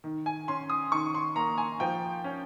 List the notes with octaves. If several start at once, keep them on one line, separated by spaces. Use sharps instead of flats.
D#3
G#5
C#4 C6
D#6
D#3 C#6
C6
A#3 A#5
G#5
F3 G5
C#4